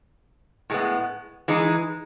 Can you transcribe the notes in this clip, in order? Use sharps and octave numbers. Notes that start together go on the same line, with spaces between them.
A2 G#3 B3
E3 G#3 D#4